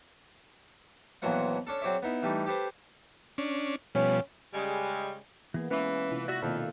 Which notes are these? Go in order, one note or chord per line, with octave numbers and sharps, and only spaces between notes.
A#1 F2 E3 F#3 B3 F#5
C#4 D4 A4
F#3 C4 G#4 C#5 D5 E5
B3 D#4 E4 B5
E3 G3 A3 D#4
G4 A4 B4 C5
C#4 D4
B2 F3 G3 C#4
C#3 G3 G#3
E3 A#3 B3 G#4
E3 G#3 C#4
C3 E4 F4
F#4 D5 E5
F2 B2 D#3 A#3